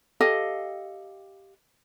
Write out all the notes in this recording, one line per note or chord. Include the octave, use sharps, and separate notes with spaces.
G4 A4 D#5 F5